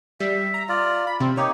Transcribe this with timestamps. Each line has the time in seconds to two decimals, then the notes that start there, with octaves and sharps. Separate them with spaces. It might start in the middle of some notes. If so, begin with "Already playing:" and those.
0.20 G3 E5
0.54 A#5
0.69 F4 D5
1.07 B5
1.20 C3 C4
1.37 A#3 D#4 G4 C#5